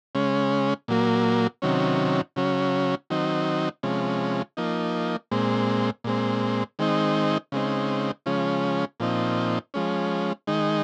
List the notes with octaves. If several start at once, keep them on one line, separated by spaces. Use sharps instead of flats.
C#3 G#3 C#4
A#2 F#3 A#3
C3 D#3 F#3 C#4
C#3 F#3 C#4
D#3 F#3 C4 D#4
C3 F3 G#3 C#4
F3 A#3 D#4
A#2 G#3 C4
A#2 G#3 C4
D#3 G#3 C4 D#4
C#3 G#3 C4 D#4
C#3 F3 G#3 C#4
A#2 F3 C4 D#4
F3 G#3 C#4
D#3 G#3 D#4